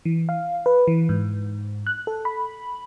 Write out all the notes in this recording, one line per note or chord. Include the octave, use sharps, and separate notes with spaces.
E3
F5
B4
E3
G#2
F#6
A4
B5